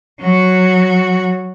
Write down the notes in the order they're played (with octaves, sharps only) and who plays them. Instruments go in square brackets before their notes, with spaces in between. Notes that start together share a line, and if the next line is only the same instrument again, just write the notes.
[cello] F#3 F#4